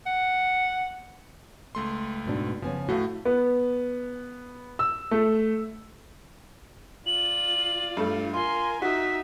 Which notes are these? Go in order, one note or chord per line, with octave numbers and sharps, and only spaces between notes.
F#5
C#2 A3 C6
G#2 B2 D4
C#3 F3 B3 C#4 G#5
A2 A3 F#4 F5
B3
E6
A3
F4 D5 F#7
G2 A3
F4 A#4 G#5 C6
D#4 F#4 E5 B6